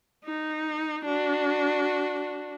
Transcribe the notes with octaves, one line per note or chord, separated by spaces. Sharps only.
D#4
D4 F#4